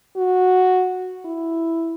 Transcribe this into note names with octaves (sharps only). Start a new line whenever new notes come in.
F#4
E4